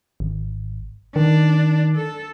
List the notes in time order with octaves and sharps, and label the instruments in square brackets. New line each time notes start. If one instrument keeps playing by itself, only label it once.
[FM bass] G#1
[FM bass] D#3 [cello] D4
[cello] A4